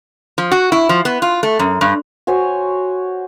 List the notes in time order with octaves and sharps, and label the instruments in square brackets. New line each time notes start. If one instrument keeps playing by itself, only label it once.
[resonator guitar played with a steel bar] F3
F#4
E4
F3
B3
F4
A3
F#2
G2
[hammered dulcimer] F#4 C5 C#5 G#5